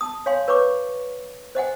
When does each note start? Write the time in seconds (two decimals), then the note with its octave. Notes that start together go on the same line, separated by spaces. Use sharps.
0.01 A5 D#6
0.26 C#5 F5 G#5 C6
0.48 B4 C#5 B5 C#6 D6
1.55 C5 D#5 F#5 G#5